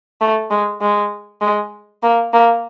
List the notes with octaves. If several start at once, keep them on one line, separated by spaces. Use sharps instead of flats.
A3
G#3
G#3
G#3
A#3
A#3